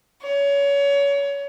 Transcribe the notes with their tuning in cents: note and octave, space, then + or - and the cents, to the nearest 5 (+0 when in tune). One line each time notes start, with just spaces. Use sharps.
C#5 +25